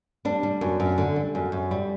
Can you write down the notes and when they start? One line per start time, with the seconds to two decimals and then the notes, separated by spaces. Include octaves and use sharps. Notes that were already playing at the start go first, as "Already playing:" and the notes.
0.25 G3 D4
0.43 G3
0.61 F#2
0.80 F#2
0.98 D3
1.16 G3
1.35 F#2
1.52 F#2
1.71 G3